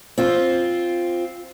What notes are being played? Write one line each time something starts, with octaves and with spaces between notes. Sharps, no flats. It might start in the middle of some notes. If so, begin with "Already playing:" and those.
C4 F4